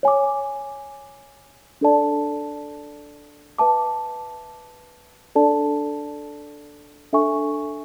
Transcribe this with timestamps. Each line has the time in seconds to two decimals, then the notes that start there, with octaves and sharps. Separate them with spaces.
0.03 C#5 G#5 D6
1.81 D4 A4 D5 A5
3.58 B4 E5 A5 D6
5.35 D4 A4 D5 A5
7.13 D4 A4 E5 G#5 C#6